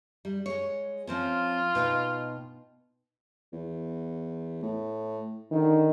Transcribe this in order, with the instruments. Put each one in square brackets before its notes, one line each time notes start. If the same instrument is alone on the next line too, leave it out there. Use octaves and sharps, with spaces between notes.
[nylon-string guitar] G3
G#3 C#5
[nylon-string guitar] F3 C4 C#4 [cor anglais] F4
[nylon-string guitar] B2 D#4 G5
[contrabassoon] E2
A2
[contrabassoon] D3 [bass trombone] D#3